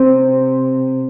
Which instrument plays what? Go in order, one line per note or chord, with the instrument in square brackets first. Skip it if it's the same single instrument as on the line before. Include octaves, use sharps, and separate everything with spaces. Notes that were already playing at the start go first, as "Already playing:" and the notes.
Already playing: [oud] C3